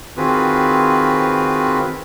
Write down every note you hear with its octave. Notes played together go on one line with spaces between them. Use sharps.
D#3 C4 F4 F#4 G#4 B4